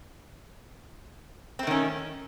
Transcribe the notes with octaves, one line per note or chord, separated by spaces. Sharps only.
D#3 A3 C4 C#4